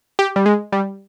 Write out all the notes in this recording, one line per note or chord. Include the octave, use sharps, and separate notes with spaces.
G4
G3
G#3
G3